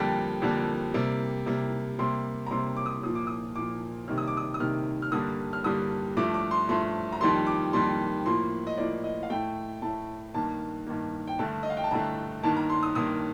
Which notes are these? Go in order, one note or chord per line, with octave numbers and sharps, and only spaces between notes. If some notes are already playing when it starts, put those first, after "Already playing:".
Already playing: F2 D3 G3 A#3 G5
F2 D3 G3 A#3
C3 G3 A#3
C3 G3 A#3
C3 G3 A#3 C6
A#5
C3 G3 A#3 C6
D6
D#6
A#2 F3 A#3 D#6
D6
D#6
A#2 F3 A#3 D6
C3 D#3 G3 A#3 F6
D#6
D6
D#6
D#6
C3 D#3 G3 A#3 F6
F6
G2 D3 G3 A#3 D#6
F6
G2 D3 G3 A#3 D#6
G2 F3 A3 D6
D6
C6
G2 F3 A3 C6
A#5
F2 D#3 G3 A#3 C6
D6
F2 D#3 G3 A#3 C6
A2 F3 A#3 C6
D#5
A2 F3 A#3 D5
D#5
F5
A2 A3 G5
A2 A3 A5
G2 D#3 A#3 A5
G2 D#3 A#3
G5
G2 D3 A3 A5
D#5
F5
G5
A5
G2 D3 A3 A#5
G2 D#3 A#3 A5
A#5
C6
D#6
G2 D#3 A#3 D#6